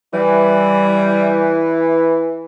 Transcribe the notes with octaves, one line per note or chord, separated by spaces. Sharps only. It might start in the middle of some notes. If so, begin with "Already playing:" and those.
E3 G3